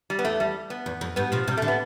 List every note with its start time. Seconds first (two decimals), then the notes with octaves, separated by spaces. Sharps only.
0.10 G3
0.19 B3
0.25 E2 A3
0.40 G3
0.70 B3
0.86 E2
1.01 F2
1.16 G2 B3
1.32 B2 F3
1.48 C3 G3
1.57 A3
1.62 D3
1.68 B3